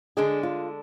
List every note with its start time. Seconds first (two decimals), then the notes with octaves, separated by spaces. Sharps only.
0.17 D3 G#3 D4 G#4
0.43 F4